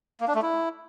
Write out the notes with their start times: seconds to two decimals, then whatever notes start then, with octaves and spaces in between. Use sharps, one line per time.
0.21 A#3
0.28 D4
0.35 A3
0.42 E4